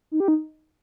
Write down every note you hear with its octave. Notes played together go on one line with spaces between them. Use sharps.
D#4
G4
D#4